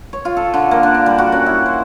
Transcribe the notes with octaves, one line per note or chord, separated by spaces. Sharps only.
C#5
F4
A4
D3
A#3
D4
D4
G3
F#4
C#4
E4
C5